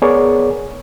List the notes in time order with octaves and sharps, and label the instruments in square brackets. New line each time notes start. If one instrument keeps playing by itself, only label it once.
[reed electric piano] B3 G#4 A#4 C#5 D5